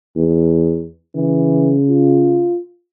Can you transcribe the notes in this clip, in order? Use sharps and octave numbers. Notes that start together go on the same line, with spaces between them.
E2
C#3 E3
F4